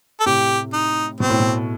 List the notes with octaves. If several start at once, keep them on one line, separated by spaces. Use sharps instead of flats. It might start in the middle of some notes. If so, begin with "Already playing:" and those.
A4
A2 C3 G4
D#4
B2 C4
A2
B2